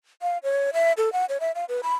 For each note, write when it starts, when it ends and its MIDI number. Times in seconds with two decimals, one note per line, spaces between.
0.22 0.38 77
0.43 0.70 73
0.74 0.92 76
0.97 1.12 69
1.13 1.25 78
1.29 1.40 73
1.40 1.52 76
1.55 1.65 77
1.69 1.81 71
1.83 1.95 83